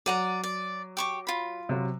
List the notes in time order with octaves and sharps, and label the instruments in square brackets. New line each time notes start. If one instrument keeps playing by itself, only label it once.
[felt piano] F#3 D#7 [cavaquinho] D5 F#5 A#5
[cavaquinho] D5
G4 C#6 D6
F4 B5
[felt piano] C3 F#3